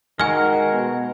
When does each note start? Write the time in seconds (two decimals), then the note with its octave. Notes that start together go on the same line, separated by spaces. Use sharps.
0.20 D#3 G#3 F#4 A#4 G#5 F6
0.72 B2